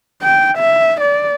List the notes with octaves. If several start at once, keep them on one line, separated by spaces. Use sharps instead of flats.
G5
E5
D5